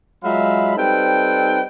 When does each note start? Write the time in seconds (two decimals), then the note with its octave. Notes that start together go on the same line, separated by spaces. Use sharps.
0.24 F#3 G#3 F4 E5 F5 B5
0.76 G3 C4 D#4 A4 B4 G5